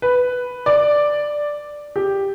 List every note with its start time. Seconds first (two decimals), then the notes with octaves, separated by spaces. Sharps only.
0.02 B4
0.66 D5
1.96 G4